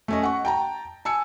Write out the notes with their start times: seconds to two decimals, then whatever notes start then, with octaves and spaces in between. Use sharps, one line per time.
0.08 A3 C#4 D#5
0.23 F#5 C#6
0.45 G5 A5 A#5
1.05 G#5 A5 E6 C#7